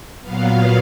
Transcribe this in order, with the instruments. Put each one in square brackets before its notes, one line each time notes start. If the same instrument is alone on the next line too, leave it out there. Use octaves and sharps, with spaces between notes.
[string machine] A#2 F#3 B3 F5